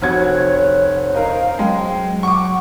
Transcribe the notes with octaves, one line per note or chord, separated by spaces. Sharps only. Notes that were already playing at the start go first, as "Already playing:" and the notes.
F1 F#4 C5 C#5 G#6
D#4 A#4 F5
F#3 G#3 G5
F#5 C#6 D6